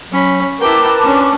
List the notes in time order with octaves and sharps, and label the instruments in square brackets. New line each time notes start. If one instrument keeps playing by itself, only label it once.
[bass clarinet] F#3 [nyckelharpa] C#4 B5
[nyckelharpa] E4 G5 [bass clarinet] A#4 [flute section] B4 A5 D6
[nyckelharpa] C#4 D4